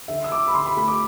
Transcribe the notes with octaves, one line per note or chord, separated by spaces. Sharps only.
D3 E5
E6
D3 D6
B5
D3 C6
B5
A3 B5
D6